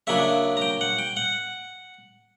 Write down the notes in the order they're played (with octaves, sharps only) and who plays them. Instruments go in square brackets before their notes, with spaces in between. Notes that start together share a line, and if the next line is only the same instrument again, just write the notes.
[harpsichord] C#3 F#3 A#3 D4 E5
A#5
G5
F#5
G5
F#5